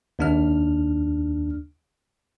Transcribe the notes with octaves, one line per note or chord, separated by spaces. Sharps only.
D#2 D4 F6